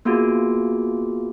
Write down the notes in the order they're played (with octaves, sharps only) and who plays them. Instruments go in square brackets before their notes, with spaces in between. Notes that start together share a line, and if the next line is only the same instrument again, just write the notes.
[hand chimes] A#3 B3 F4 F#4 G#4